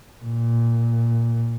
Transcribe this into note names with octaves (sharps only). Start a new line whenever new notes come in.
A#2